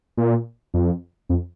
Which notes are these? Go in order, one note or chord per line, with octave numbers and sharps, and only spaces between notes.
A#2
F2
F2